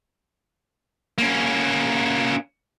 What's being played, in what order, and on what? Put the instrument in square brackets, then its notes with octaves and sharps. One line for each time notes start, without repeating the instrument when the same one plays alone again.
[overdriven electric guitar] A#3 C#4